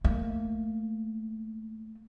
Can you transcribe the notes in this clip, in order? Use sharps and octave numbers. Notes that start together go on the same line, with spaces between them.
A3 A#3